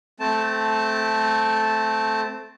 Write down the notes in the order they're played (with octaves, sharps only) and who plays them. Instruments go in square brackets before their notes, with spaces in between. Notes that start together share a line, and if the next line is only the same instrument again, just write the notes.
[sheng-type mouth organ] A3 C4 A5